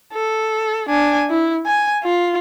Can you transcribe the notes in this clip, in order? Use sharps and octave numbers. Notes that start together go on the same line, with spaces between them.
A4
D4 G#5
E4
G#5
F4